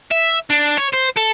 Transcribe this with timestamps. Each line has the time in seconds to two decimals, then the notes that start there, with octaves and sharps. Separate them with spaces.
0.11 E5
0.50 D4
0.78 C#5
0.94 C5
1.17 A4